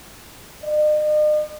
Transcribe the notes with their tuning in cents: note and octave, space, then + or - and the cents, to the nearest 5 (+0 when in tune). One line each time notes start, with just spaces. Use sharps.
D#5 -45